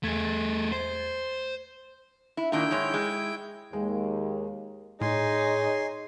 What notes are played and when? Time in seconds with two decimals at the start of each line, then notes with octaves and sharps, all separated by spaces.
0.04 E2 A3 G#4 G#6 A6
0.72 C5
2.37 E4
2.52 A#2 D#3 D4 E4 G5 G6
2.71 G#2 G#3 C#5
2.94 G#3
3.73 D#2 G#3
5.01 A2 D#4 G#4 C#5 G#5 C6